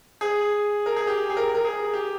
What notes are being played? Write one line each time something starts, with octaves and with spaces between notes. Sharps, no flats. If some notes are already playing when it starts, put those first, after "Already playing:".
G#4
A#4
G#4
G4
G#4
A#4
A#4
G#4
G4